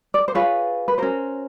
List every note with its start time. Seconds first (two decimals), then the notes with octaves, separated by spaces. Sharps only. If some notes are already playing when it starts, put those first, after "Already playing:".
0.14 D5
0.28 C5
0.35 F4 G#4 B4 C#5
0.88 B4
0.98 C#4 F#4 A#4 C5